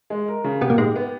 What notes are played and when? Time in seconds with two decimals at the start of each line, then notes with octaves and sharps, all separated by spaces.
0.10 G#3
0.28 A#4
0.44 C#3
0.61 B2 B3 G4
0.70 A#2 A#3
0.78 G#2 G#3 G4
0.96 B3